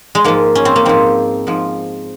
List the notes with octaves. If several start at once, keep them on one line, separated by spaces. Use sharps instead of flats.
G#3
G#2 F3 A#3
C#4
C4
A#3
G#2 F3 C4
G#2 F3